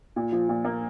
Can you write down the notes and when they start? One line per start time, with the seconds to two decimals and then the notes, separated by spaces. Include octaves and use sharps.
0.16 A#2
0.32 F3
0.49 A#2
0.65 A#3